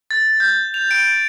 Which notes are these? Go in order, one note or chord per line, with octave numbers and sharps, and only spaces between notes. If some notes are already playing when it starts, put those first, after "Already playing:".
A6
G6
F7
D7